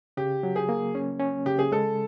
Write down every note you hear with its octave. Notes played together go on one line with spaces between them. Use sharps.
C#3 G4
F#3
G#4
A#3
C#4
C#4
C#3 G4
G#4
G#3 A4